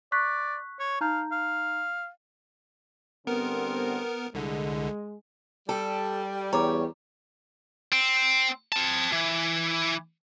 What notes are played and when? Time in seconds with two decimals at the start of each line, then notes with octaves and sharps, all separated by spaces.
0.12 D5 C#6 F#6 B6
0.79 C#5
1.01 D#4 F5 A#5 G6
1.32 F5
3.27 D3 G3 B3 C4 A#4
4.34 C2 D3 G#3
5.69 G3 A4
6.53 E2 C#5 A#5 D6
7.92 C4
8.72 C4 A5
9.13 E3